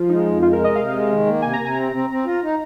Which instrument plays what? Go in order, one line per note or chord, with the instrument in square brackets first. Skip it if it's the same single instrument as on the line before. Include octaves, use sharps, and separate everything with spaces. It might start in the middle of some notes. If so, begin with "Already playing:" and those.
Already playing: [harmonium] F3 [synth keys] F4
[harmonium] G#3 [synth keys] D#4
[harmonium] F2
[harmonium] G#3 [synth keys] F4
[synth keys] A#4
[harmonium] C3
[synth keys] D#5
[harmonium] C3 [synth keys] F5
[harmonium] G#3
D#3
A#3
[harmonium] C3 [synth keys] G#5
[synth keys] A#5
[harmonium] C3
[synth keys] G#5
[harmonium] C4 [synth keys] A#5
[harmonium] C4
C4
F4
D#4